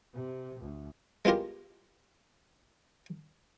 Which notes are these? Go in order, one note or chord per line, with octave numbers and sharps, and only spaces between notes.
C3
D2
G#3 B3 F4 G4 A#4